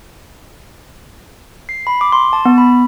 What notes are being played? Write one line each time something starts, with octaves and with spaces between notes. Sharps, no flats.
C7
B5
D6
C6
A5
B3
B5